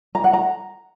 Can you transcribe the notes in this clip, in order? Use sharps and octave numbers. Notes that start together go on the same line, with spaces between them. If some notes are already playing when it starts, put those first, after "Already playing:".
A#5
F#5
A#5